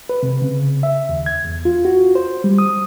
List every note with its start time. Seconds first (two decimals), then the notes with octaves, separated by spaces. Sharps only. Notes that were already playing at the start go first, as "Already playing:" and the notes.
0.09 B4
0.23 C3
0.42 C#3
0.83 E5
1.09 D#2
1.26 G#6
1.45 E2
1.65 F4
1.85 F#4
2.15 C5
2.44 G3
2.58 D#6